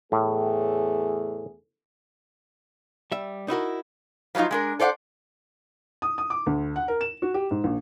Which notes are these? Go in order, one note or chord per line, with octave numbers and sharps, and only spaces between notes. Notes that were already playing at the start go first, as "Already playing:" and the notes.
E2 A2 A3 G#4
G3 E5
D#4 E4 F#4 A#4
F3 F#3 G#3 D#4 F4
G#3 D4 A#4
A4 C5 D5 F5 F#5
D#6
D#6
D6
D2
F#5
A#4
E7
F#4
G4
G#2
A#1